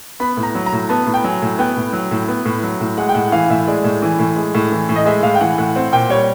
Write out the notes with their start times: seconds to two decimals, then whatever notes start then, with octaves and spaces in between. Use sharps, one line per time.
0.20 B3 B5
0.37 A2
0.43 A#5
0.55 F#3
0.66 A#5
0.72 A2
0.89 B3 A5
1.06 A2
1.14 G5
1.24 F#3 G#5
1.42 A2
1.58 B3 G5
1.77 A2
1.93 F#3
2.11 A2
2.28 B3
2.45 A2
2.63 F#3
2.80 A2
2.97 G#3 F#5
3.09 G5
3.14 A2 F#5
3.32 E3 F5
3.50 A2 E5
3.67 G#3 D5
3.84 A2
4.02 E3
4.19 A2
4.36 G#3
4.54 A2
4.72 E3
4.89 A2
4.96 D#5
5.05 G#3 E5
5.23 A2 F5
5.35 G5
5.41 E3 F#5
5.58 A2 F#5
5.75 C4 F#5
5.92 A#2 G5
6.09 G3 C#5